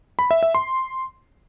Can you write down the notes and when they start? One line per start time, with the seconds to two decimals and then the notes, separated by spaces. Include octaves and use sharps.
0.19 B5
0.31 E5
0.43 E5
0.55 C6